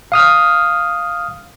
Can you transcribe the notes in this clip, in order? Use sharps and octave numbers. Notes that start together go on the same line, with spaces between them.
F5 D#6 F6